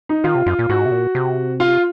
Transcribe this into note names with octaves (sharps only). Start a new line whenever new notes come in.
D#4
D#3 F4
C3
F#2 F4
A#2
G#2 F#4
C3
A#2
C3
F4